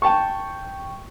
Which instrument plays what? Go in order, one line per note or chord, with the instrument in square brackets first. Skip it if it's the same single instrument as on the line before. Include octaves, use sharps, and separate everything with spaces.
[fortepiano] G5 A5 C#6